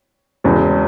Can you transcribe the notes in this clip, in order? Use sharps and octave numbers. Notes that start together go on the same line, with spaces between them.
E1 E2 C#3